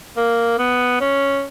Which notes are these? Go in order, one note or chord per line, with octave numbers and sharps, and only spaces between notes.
A#3
B3
C#4